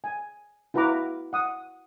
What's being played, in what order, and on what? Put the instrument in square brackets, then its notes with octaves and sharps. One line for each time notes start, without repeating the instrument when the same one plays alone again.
[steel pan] G#5
E4 F#4 B4 F5 A#5 D6
F#5 D#6